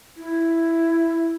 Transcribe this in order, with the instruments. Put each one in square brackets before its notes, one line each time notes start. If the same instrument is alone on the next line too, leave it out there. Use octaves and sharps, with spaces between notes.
[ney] E4